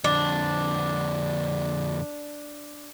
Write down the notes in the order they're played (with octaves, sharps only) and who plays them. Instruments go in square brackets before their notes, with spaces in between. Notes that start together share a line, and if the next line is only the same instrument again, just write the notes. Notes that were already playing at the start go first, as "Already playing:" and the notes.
[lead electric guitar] F2 D3 [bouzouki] D4